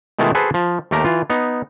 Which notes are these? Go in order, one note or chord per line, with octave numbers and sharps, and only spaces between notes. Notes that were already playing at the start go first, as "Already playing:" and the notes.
B2 D#3 G#3 A3 E4 F4
F#4 G#4 A4 B4 C5
F3
D#2 A3 G4 A#4 A#5
E3 F4
B3 D#4